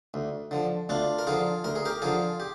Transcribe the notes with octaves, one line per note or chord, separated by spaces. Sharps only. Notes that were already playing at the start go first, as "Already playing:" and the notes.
D2
D3 F3
D2 D4 F4
A#4
D3 F3 F4 G#4
D2 A#4
G#4
G4 A#4
D3 F3 F4 G#4
G4